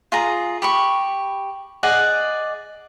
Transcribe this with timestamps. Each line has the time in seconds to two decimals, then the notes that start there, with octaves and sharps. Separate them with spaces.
0.12 F4 G#4 A#5
0.62 G4 B5 C#6
1.83 G#4 D5 D#5 F#5